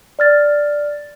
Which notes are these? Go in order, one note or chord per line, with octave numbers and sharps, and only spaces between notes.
D5 F6 A6